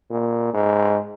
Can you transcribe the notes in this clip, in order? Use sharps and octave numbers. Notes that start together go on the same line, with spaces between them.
A#2
G#2